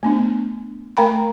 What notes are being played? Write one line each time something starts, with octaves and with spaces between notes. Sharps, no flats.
A3 B3 D4
A3 A#4 F5 G5 A#5 B5